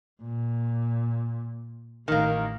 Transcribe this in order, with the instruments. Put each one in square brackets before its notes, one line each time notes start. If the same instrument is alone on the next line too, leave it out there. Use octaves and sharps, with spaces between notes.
[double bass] A#2
[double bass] A1 [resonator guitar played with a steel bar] D#3 A#3